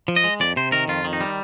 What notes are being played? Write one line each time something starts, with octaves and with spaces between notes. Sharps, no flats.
F3
D#5
G#3
F2 D5
C3 C5
D#3 A#4
F2 F4
D#3
D#4
G3